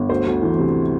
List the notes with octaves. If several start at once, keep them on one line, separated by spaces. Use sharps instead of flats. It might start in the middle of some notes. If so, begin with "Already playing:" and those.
Already playing: G1
D2 C5
D2
E3
C3